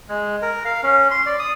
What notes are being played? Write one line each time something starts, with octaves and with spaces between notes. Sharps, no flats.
G#3
A#4
F5
C#4
C6
D5
D#6